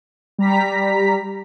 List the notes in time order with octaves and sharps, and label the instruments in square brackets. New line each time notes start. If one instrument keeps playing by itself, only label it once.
[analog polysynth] G3 A#5 B6